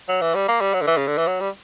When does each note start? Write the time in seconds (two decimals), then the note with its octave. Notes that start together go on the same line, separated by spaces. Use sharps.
0.08 F#3
0.22 E3
0.35 G3
0.48 A#3
0.61 G3
0.74 F#3
0.82 D3
0.87 E3
0.97 C#3
1.07 D3
1.18 E3
1.27 F#3
1.41 G3